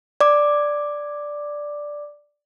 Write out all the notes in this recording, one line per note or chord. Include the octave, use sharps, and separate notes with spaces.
D5 D6